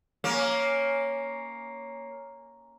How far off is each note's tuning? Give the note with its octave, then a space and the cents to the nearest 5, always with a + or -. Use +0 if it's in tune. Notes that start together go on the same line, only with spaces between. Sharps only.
A#3 +0 C#4 +0